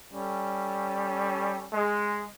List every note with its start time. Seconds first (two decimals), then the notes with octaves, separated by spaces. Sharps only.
0.13 G3 C#4 A4
1.73 G#3